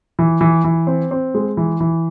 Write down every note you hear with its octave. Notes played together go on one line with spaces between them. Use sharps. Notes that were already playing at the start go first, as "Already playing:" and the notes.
E3
E3
E3
C4
C4
G#3
E3
E3